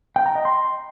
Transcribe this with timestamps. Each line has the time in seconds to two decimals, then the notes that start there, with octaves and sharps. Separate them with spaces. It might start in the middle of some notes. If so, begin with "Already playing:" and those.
0.16 G5
0.26 A#5
0.35 D#5
0.45 C6